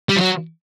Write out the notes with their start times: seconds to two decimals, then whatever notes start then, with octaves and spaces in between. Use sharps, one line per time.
0.09 G3
0.17 F3
0.21 F#3